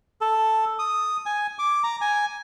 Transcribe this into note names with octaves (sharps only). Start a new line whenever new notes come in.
A4
D#6
G#5
D6
A#5
G#5